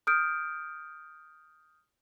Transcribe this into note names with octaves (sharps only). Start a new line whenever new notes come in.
D#6 F6 G6 D7